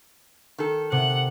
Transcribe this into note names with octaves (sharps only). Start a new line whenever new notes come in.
D#3 A4
C3 F#5